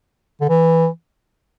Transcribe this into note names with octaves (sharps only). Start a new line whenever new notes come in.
D3
E3